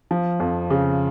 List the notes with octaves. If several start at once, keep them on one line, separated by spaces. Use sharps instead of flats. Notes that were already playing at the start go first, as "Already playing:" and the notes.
F3
F2
C#3